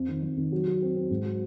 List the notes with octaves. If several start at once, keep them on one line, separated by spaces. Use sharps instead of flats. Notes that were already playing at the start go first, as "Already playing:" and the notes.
Already playing: F2
D#3
F2
D#3
F#3
F#3
C4
C4
G#2
F#3